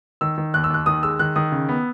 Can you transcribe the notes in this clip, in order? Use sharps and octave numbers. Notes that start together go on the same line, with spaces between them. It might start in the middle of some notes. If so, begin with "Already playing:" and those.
D#3 E6
D#3
D#2 F#6
E6
D#2 F#6
D#3 D#6
G#3 E6
D#3 F#6
D#3 D#6
C#3
B3